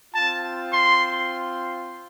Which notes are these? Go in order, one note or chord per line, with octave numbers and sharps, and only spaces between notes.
C4 F4 A5
C6